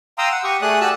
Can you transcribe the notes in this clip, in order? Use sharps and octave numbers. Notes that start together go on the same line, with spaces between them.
F5 G5 A#5 C6 D#6 E6
F#5
G4 C#6 D#6
A3 G#4 D5 D#6 F#6
F#4 G4 A5 E6 F#6